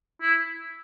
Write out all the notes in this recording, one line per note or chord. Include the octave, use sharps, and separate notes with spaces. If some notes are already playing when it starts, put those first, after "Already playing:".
E4